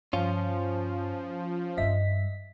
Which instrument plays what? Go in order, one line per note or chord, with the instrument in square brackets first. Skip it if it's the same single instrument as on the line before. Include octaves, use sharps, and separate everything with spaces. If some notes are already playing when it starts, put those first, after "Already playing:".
[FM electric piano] G2 [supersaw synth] F3 [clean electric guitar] C#4 F4
[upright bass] G2 G3 [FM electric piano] D#5 E5 B6